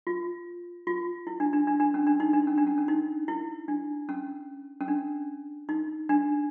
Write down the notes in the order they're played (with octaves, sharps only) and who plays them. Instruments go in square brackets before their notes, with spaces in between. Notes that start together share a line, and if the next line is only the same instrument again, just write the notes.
[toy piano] F4
F4
E4
D4
D4
D4
D4
C#4
D4
D#4
D4
C#4
D4
C#4
C#4
D#4
E4
D4
C#4
C#4
D4
D#4
D4